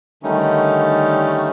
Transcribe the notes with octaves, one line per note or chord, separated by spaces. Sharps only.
D3 D#3 G3 A3 C#4 D#4